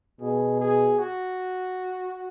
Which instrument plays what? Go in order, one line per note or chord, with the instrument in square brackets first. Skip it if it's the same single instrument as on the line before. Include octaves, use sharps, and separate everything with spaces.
[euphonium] B2 [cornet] G#4
[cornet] G#4
F#4